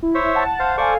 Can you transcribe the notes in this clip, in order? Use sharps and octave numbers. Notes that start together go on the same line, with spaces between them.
E4
C5 C#5 E5
F#5 A5
C5 F5
A4 C5 D5 F5 G#5 C#6